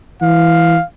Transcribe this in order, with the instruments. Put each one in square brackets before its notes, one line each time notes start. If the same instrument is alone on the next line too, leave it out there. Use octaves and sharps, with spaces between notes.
[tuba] E3 [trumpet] F5